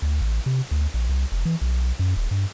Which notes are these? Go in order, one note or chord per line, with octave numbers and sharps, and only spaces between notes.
D2
A1
C3
D2
A#1
C2
F1
E3
B1
F#2
D#1
G2